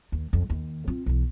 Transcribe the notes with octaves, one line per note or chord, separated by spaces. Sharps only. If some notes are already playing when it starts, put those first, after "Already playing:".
D#2
F2
D#2
C4 F4
B1 E3